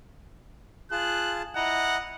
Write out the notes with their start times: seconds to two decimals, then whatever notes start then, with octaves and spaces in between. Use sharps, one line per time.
0.91 F4 G#4 A5 F#6
1.56 E4 D#5 F#5 A#5